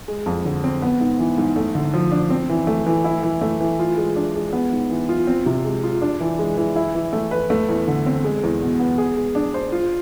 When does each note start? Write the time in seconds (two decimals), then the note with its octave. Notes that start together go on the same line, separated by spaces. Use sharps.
0.08 G#3
0.26 F2
0.45 D3
0.64 C4
0.82 B3
1.01 G#2
1.19 E3
1.38 G#2
1.56 A3
1.75 D3
1.93 F3
2.12 D4
2.30 C4
2.49 E3
2.67 A3
2.86 E3
3.04 E4
3.23 E3
3.41 A3
3.60 E3
3.79 F4
3.97 G#3
4.16 D4
4.35 G#3
4.53 B3
4.72 G#2
4.90 E3
5.09 F4
5.27 C4
5.46 C3
5.65 G#3
5.83 F4
6.02 D4
6.20 E3
6.39 G#3
6.57 E3
6.76 E4
6.95 E3
7.13 A3
7.31 B4
7.50 A3
7.69 E2
7.87 D3
8.06 C4
8.24 G#3
8.43 E2
8.62 B2
8.80 B3
8.98 G#4
9.17 G#3
9.35 D4
9.54 C5
9.72 F4